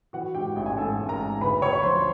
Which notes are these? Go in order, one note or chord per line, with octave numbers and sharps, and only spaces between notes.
E3 F#4 F#5
G#2 G4 G5
A1
G#5
G#2 A4 A5
A1
A#4 A#5
G#2
D2 B4 B5
D2 C#5 C#6
B5
F3 C5 C6